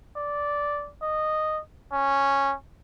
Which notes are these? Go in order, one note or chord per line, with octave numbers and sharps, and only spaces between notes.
D5
D#5
C#4